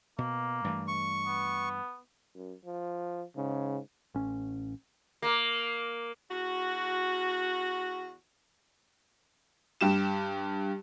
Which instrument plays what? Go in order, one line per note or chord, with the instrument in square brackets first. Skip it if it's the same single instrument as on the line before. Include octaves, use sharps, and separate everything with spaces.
[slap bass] B2 [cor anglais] A#3
[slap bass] G2 E3 A3
[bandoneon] C#6
[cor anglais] B3
[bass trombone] F#2
F3
[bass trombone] G#2 [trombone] C#3
[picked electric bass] A1 C#4
[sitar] A#3
[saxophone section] E2 F#4
[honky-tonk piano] G2 G4 E7